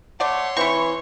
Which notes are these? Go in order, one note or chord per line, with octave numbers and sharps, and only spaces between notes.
A3 C#5 D5 F#5 C6
E3 C4 E4 C#6